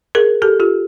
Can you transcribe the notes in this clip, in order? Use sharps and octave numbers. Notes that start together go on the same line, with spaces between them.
G#4 A#4
G4 A4
F4 G4